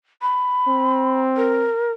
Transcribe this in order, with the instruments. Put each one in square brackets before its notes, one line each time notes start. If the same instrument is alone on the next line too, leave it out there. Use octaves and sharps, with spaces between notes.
[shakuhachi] B5
[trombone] C4
[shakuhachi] A#4